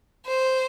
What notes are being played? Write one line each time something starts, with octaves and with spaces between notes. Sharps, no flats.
C5